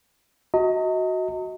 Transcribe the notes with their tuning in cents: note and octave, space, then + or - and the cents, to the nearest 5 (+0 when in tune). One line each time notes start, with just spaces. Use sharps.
F#4 +0 D#5 +30 A#5 -40